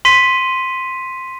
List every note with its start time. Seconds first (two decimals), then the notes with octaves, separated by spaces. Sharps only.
0.05 C6 B6 D#7